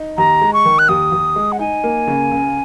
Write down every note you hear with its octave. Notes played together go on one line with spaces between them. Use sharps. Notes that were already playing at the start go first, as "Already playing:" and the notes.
Already playing: D#4
D#2 A#5
G#3
C#6
D#3
F#6
D#2 D#6
D#2
G#3
F#5
D#4 G#5
A#3
C#3
C#2